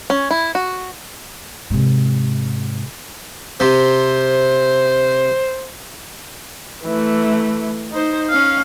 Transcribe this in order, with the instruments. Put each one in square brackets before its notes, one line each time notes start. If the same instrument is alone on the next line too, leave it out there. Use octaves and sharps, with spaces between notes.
[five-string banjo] C#4
E4
F#4
[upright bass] G#2 C3
[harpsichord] C3 [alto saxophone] C5
[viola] E3 A3
D#4 C5
C#4 F5